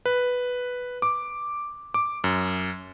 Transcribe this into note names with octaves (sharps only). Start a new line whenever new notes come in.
B4
D6
D6
F#2